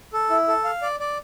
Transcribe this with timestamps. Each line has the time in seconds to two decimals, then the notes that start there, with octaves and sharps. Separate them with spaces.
0.13 A4
0.30 E4
0.48 A4
0.64 F5
0.82 D5
1.00 D5